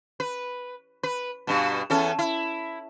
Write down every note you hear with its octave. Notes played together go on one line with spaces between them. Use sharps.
B4
B4
G2 B2
E2 C#4 A4
E4